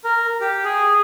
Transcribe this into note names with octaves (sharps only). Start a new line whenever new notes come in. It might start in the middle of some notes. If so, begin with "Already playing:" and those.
A#4
G4
G#4